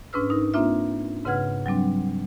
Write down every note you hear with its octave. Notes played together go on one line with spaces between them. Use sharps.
G#2 C#4 D4 B4 E6 F6
D#4 A#4
A#3 C4 D4 F4 E5
G#2 C#3 B4 F#5 F6 G#6
F#3 G3 C4 D4